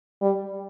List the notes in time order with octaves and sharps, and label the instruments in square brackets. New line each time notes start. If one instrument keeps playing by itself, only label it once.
[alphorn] G3